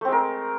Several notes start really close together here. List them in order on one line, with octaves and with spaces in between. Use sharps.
A3 C4 G#3 A#4